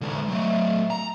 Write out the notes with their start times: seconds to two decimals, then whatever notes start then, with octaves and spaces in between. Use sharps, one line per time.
0.01 D3 G#3
0.28 F#3 A3
0.90 A#5